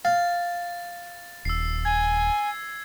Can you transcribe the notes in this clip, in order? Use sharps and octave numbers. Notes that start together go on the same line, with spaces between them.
F5 A6
D#1 E6 C7
G#5 G#6